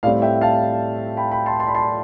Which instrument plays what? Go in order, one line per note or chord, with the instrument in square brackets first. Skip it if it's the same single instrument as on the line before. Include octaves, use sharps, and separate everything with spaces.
[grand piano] A2 G3 C4 D5 F5
E5 G5
F5 A5
G5 B5
G5 B5
A5 C6
A5 C6
B5
A5 C6